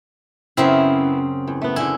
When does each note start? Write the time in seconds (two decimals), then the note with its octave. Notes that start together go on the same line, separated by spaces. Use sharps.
0.57 F#2 C#3 B3 C4 E4
1.48 E2
1.62 A3 B3
1.76 E2 D3 E4 G#5